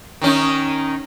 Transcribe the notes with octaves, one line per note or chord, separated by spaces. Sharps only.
D#3 C#4 D#4